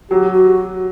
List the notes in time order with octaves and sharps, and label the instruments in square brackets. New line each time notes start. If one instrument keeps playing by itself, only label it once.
[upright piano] F#3 [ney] G4
[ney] F#4